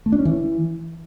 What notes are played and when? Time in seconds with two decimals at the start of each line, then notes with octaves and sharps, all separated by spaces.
0.06 A3
0.12 D4
0.19 C#4
0.25 E3